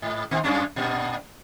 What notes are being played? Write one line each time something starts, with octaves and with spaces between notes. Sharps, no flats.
G#2
A#2 D#3 C4
F#2 C#4 D4
G2 A#2